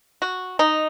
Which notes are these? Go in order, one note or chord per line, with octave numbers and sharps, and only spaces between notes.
F#4
D#4